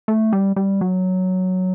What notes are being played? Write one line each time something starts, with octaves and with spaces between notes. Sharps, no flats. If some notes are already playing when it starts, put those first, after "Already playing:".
A3
G3
G3
F#3